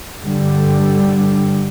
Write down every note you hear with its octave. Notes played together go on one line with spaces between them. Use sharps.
G2 D3 G3